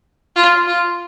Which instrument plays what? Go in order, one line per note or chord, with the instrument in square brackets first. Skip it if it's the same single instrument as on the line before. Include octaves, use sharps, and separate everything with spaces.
[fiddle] F4
F4